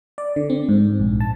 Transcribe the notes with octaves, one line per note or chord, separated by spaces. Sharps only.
D5
D3
C4
G#2
A#1
A5